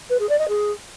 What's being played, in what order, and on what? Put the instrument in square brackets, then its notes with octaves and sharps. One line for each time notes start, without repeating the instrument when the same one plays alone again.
[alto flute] B4
G#4
D5
D#5
G#4